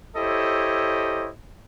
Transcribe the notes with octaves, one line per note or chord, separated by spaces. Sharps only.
E4 G4 A4 C5 C#5 D#5